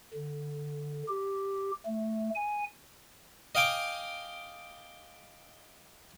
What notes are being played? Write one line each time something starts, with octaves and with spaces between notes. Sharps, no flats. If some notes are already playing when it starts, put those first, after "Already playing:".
D3
G4
A3
G#5
D#5 F5 G5 G#5 D6